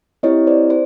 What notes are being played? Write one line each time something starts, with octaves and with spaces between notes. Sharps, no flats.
C4 E4 G4 C#5 D#5
C5 D5
C5